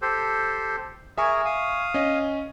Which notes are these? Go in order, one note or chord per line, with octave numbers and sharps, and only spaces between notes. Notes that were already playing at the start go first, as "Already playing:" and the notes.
G4 A4 C5
G#4 A#4 E5 G#5 C#6
F5 D#6
C#4 D#5